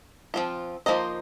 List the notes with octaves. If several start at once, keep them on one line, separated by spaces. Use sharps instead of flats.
F3 C4 F4
F3 A#3 D#4 C5 D#5